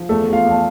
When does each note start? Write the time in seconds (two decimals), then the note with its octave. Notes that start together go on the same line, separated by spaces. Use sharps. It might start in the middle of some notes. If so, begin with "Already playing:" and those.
Already playing: F3
0.09 E2 A3 A4
0.27 E2
0.32 F4 F5
0.45 E2
0.51 A5